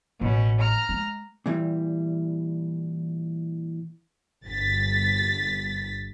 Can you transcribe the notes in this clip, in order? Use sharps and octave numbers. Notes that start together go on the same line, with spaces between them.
A1 B2 C#4
A#5 F6
G#3
A#2 E3 G3
G1 A6 B6